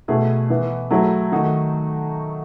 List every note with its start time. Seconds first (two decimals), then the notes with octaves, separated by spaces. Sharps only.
0.08 B2 A3 E4 G#4
0.50 E3 B3 E4
0.91 F#3 A3 E4 G#4
1.32 D#3 A3 D#4 F#4